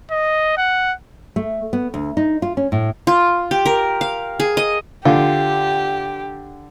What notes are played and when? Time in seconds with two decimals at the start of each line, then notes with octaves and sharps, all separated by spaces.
0.11 D#5
0.58 F#5
1.36 A3
1.73 B3
1.94 D2
2.17 D#4
2.42 F4
2.57 C#4
2.72 A2
3.07 F4
3.51 G4
3.66 A#4
4.01 F5
4.40 G#4
4.57 D#5
5.05 D3 F4 G4